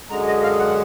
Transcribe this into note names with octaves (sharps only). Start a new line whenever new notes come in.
F#2 D3 G#3 A#5
D#5
F5
F#5